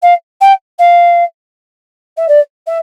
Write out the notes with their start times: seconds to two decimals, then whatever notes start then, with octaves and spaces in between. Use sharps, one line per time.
0.02 F5
0.41 G5
0.78 F5
2.17 E5
2.28 D5
2.66 E5